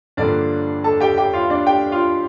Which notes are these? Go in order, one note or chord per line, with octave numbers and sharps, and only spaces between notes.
G2 D3 F3 A#3 D4 D5
A4 A5
G4 G5
G4 G5
F4 F5
D4 D5
G4 G5
F4 F5